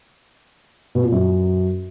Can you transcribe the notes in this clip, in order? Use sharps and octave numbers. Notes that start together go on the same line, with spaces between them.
B2
A#2
F#2